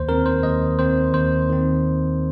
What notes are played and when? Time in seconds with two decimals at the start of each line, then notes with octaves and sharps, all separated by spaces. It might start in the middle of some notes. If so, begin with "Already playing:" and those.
Already playing: D#2 C5
0.09 D#3 C4 A#4
0.26 C5
0.43 D#2 D#5
0.79 D#3 C4 C5
1.13 D#2 C5
1.49 D#3 C4